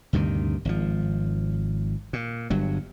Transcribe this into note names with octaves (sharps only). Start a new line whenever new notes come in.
D2 G2 C3 D#3
G#1 F3
A#2
G1 G2 F#3